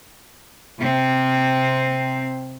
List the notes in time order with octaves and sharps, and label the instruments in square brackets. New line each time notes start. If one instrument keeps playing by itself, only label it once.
[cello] C3 C4